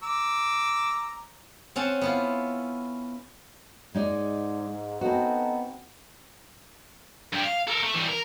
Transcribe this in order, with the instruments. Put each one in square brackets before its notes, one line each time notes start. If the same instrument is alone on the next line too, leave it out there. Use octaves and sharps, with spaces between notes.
[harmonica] A#5 D6 E6
[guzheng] C4 C#4 F#5 A5
B3 E4 F4
[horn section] G#2 [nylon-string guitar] G#3 D#4 D5
[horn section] B3 D#4 A4 [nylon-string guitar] C4 F#4
[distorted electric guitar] G2 G4
F5
A4 A#4
A3
E3 G3
A#4